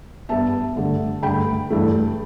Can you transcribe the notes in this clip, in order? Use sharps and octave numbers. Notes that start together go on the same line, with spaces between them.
G2 G3 B3 E5 A5
G2 D3 A3
G2 D3 A3 G5 B5
G2 E3 A3